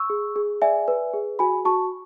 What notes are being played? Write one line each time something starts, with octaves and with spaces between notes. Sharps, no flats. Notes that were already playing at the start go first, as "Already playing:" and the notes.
Already playing: C#6 E6
G#4
G#4
D5 E5 G#5
B4
G#4
F#4 G#5 B5
F#4 A5 C#6